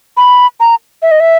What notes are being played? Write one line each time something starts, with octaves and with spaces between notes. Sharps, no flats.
B5
A#5
E5
D#5
E5